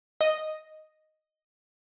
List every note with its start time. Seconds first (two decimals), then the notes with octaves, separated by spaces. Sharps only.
0.21 D#5